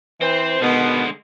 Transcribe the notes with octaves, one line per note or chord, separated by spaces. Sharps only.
E3 C4 C5
B2 D3 D#3 G#3 B3